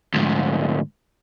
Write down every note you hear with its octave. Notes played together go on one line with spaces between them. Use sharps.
D2 G#2